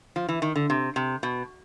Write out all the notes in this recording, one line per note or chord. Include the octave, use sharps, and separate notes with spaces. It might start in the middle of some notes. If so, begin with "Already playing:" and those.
F3
E3
D#3
D3
C3
C3
B2